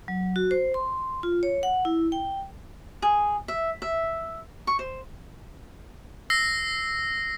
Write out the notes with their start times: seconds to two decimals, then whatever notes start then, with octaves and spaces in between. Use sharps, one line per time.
0.08 F#3
0.36 F#4
0.51 C5
0.74 C6
1.23 F4
1.43 C#5
1.63 F#5
1.85 E4
2.12 G5
3.02 G#4
3.48 E5
3.82 E5
4.67 C#6
4.79 C5
6.30 E6 A#6 C7